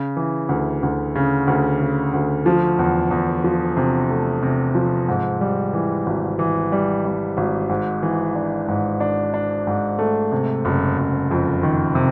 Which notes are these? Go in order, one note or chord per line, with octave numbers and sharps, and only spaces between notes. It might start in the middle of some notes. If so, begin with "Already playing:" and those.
Already playing: C#3
E3
D2
D2
C#3
D2
C#3
D2
F3
E2
E2
F3
C3
A3
C3
F3
G#2
G3
E3
G#1
E3
G3
G3
G#1
G#2
E3
D4
G#2
D4
D4
G#2
A3
C3
F#1
F#1
F2
D#3
C3